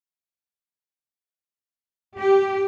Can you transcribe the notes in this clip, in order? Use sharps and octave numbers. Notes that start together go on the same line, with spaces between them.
G4